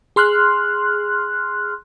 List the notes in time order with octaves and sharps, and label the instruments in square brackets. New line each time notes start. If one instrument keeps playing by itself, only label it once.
[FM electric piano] G#4 C6 F6 F#6